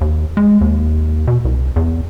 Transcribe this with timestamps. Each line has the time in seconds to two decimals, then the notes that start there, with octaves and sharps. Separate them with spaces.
0.01 D#2
0.37 G#3
0.61 D#2
1.27 B2
1.45 C2
1.76 E2